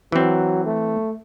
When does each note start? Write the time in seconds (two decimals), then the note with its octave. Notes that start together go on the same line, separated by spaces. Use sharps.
0.12 E3 F#3 C4
0.65 A3